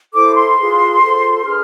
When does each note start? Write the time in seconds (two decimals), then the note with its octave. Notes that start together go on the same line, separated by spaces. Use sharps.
0.14 E4 A4 C5 D6
0.35 C6
0.58 F4 G#4 B4
1.02 F4 A4 C5
1.46 D4 G#4 B4 F6